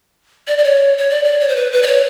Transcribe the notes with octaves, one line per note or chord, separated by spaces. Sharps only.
D5
D5
C#5
C#5
D5
D5
C#5
C5
B4
B4
D5
C#5